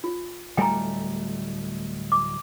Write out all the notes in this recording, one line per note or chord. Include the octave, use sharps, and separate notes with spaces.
F4
D1 G3 A3 G5 G#5 A#5
D6